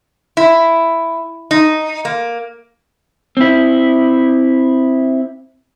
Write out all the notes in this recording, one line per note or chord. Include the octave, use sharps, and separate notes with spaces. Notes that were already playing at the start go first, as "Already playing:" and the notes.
E4
D#4
A#3
C4 E4